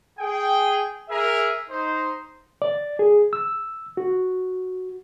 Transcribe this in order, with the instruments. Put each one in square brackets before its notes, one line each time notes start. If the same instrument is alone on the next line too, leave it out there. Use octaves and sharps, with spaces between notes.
[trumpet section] G#4 G5
G#4 A#4 E5
D#4 C5
[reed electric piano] D5
G#4
E6
F#4